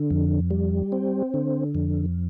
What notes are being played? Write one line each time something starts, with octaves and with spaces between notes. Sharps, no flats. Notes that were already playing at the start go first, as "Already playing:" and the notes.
Already playing: D3
F2
G3
C4
D3
F2